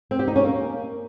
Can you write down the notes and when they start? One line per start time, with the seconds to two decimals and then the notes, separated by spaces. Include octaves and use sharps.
0.11 C4
0.19 G4
0.27 D#4
0.36 C#4
0.44 A#3